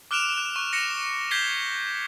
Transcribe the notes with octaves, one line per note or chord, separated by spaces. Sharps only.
D6 F6 F#6 D7 E7 F7
F#6
C#6 F#6
A#6 C#7 F7
G6 G#6 B6 C7 G7